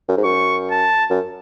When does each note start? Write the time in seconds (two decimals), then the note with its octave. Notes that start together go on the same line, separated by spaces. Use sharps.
0.08 F#2
0.17 G#2
0.24 F#2 C#6
0.71 A5
1.10 F#2